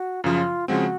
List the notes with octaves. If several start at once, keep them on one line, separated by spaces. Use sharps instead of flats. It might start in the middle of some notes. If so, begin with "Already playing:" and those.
Already playing: F#4
F#2 C#3 F3 F4
C#3 F3 G#3 C4 F#4